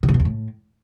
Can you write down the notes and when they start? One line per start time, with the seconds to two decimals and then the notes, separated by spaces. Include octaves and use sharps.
0.03 C3
0.09 A2
0.14 B2
0.20 E2
0.25 A2